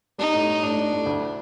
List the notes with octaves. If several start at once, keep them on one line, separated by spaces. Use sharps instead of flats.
G3 D#4
A2
A2
A2 D4
G3
A2
D2